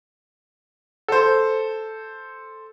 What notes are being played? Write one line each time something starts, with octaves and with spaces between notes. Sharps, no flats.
A4 C5